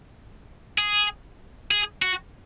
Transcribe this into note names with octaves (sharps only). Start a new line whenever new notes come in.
G#4
G#4
F#4